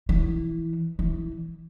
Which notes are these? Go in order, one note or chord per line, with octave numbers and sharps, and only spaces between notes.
E3
E3